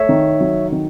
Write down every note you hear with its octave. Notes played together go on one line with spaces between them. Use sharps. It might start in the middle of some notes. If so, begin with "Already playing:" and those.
Already playing: A3 C#5 E5
D#3
F#3
D#3